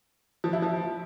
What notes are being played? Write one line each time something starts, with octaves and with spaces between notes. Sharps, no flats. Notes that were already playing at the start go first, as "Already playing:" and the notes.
F3
E4
F3